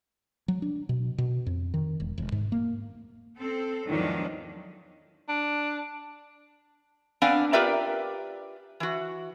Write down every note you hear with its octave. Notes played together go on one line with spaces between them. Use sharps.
F#3
D4
B2
B2
F2
D#3
E1
E1
G#2
A#3
C4 A4
E2 G#2 D#3 F3 F#3 D4
D4
B3 C4 D4 D5 F5 G#5
F4 G4 A#4 B4 D5 E5
E3 F#4